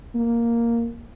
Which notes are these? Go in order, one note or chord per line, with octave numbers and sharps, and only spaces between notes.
A#3